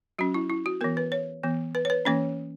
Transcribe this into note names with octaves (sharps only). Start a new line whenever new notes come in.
F#3 C#4 F#4
E4
E4
F#4
E3 B3 A#4
B4
C#5
E3 B3
B4
C#5
B4
E3 A#3 C#4 C#5